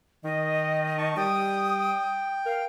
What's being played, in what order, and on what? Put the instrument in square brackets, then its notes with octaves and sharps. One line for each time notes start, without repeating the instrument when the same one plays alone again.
[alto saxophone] D#3 [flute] D#5
[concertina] A5 C#6
[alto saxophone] G3 [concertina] G5 [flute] D#6
[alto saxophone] A#4 [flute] F5